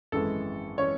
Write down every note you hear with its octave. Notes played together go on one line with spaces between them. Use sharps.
G#1 F#2 E3 G#3 A4
E3 G#3 C#4 C#5